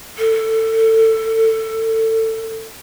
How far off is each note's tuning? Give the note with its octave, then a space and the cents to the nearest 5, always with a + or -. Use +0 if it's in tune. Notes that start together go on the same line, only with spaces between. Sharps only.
A4 +20